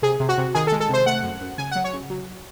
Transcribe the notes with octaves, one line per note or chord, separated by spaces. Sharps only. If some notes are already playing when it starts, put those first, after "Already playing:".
C3 G#4
C3
F#4
C3
D#3 G#4
A4
G#3
A4
C3 C5
A3 F#5
F#2
F#2
C#3 G#5
F#3 F#5
C#5
C#3
F#3